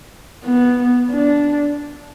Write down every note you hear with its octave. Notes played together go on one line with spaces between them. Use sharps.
B3
D4